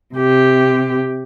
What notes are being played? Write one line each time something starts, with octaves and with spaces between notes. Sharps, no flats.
C3 G4